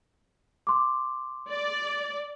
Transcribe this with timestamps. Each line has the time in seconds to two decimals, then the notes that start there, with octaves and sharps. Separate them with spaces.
0.67 C6 D6
1.50 D5